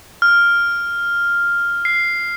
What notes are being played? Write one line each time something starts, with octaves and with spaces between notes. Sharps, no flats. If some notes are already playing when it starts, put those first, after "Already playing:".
F6
C7